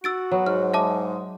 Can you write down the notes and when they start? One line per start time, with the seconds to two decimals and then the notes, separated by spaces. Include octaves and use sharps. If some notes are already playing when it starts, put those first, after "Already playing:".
0.04 F#4 E6 A6 D7
0.31 F#3 B3
0.46 G#2 F6
0.74 G#3 E5 A5 D6